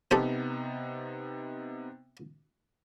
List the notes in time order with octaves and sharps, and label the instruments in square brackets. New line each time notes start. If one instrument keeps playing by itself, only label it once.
[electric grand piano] C3 B3 D#4 [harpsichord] C4 G4 A4